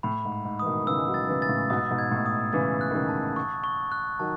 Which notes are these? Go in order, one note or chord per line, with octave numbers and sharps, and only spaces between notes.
A2 B5
G#2
B5
G#2
E3 D#6
B2 D#3
D#3
C#3 E3 E6
G#3
D#3 F#3
A6
C#3 E3
A6
A2 C#3
G#2 B2 D#6
G#2 B2
G#6
A2
D#6
C#3 E3 A6
F#6
D#3
C#3 E3
A5
C#6
C#6
F#6
D#3 F#3 A5